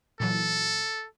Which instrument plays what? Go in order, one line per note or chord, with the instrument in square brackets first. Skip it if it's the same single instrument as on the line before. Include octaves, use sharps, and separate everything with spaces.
[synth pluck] A#2 E3 F#3 [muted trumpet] A4